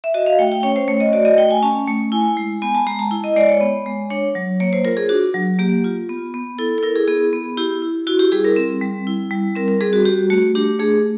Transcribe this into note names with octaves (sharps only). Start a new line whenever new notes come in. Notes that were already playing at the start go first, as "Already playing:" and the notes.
E5
F#4 D#5
F5
A3 G5
G5
C#4 C#5
C5
A3 C#5
D#5
F#4 D5
D#5
A3 G5
G#5
C#4 A5
A3
E4 G#5
G#3
B3 G#5
A5
G#3 A#5
A5
E4
D#5
G#3 D5
C#5
B3
G#3
D4 C#5
F#3
A#3 C#5
C5
F4 A#4
G#4
D4 F#4
F#3
A#3 G4
F4
B3
B3
E4 A4
A4
E4 A#4
G#4
B3 G#4
B3
E4 G4
E4
E4 F#4
G4
G3 G#4
A#4
C4
G3
E4
G3
C4 A#4
A#4
G3 G#4
F#4
F#4 G4
A3 F#4
D4 G4
A3 G#4